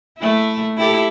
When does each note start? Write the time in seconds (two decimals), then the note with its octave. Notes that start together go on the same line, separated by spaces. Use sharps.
0.18 A3 E4
0.77 E4 G4 A4